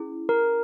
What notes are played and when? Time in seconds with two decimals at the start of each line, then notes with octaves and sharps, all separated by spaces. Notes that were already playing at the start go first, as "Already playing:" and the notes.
Already playing: C#4 E4 G#4
0.29 A#4